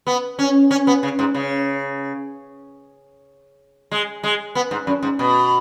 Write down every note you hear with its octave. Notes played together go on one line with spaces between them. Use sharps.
B3
C#4
C#4
B3
C#3
G#2
C#3
G#3
G#3
B3
G#2
F#2
G#2
B2